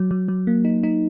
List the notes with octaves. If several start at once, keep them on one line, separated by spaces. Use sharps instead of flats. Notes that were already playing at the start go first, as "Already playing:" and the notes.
Already playing: F#3
F#3
F#3
A#3
D#4
D#4